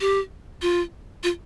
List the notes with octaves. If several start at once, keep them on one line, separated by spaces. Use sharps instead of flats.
G4
F4
F4